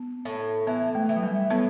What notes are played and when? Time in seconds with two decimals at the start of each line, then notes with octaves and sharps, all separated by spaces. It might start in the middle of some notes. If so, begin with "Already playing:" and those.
Already playing: B3
0.25 A2
0.67 E3 B3
0.95 A3
1.09 E3
1.16 F#3
1.23 G3
1.50 A2 B3